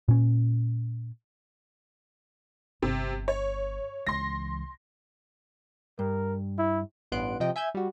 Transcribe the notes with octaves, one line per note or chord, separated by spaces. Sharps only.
A#2 C#4
G1 C3
C#5
C#2 E3 C6 A#6
G2 A#4
E4
A1 G2 B3 C6 F#6 D7
C3 F3 D#5 G5
E5 G#5 E6 G6 G#6
G3 F#4